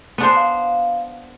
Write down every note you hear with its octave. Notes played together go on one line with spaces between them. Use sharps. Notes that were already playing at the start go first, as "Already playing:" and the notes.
B3 D4 C5
F5